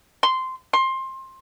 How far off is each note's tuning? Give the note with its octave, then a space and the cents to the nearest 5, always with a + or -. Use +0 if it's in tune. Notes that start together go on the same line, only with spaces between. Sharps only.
C6 -10
C6 +20